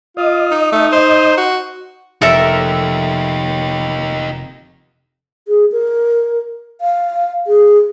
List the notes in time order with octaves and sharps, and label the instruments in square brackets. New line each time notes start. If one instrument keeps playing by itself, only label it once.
[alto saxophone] F4 [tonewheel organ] D#5
[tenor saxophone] D#4
[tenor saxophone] A3 [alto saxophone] D#4
[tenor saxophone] C5
F#4
[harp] F1 [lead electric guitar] D#4 G4 [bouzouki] A4 A#4 E5
[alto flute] G#4
A#4
F5
G#4